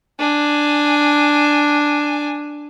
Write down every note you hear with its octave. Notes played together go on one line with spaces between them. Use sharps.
D4 G#5